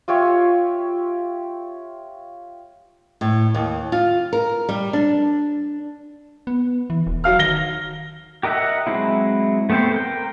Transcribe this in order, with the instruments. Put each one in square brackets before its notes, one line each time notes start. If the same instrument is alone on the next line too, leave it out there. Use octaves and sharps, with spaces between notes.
[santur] F4 G4 C#5 E5
[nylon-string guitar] A2
D#2
F4
A#4
G3
D4
[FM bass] B3
E3
E1
[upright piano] F#3 F5 F6
[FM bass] D#3 [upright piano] A#6 G7
[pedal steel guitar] G4 A#4 D#5 E5 F#5
F#3 G#3 C4 E4
A3 B3 C4 G4 C5
A#4 G5